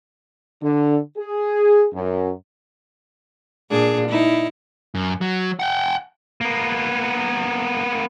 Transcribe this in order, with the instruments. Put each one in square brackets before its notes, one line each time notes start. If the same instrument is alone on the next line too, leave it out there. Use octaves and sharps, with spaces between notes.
[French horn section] D3
G#4
F#2
[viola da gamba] A#2 D4 G#4
D#4 E4
[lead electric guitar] F#2
F#3
F#5 G5
A#3 B3